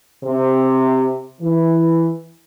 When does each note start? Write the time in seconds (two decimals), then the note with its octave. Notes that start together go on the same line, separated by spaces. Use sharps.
0.24 C3
1.41 E3